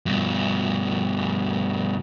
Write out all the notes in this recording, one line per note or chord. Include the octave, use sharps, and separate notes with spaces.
G2 B2